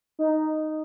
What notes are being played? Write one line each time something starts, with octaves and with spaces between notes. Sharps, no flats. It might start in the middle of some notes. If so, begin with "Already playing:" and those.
D#4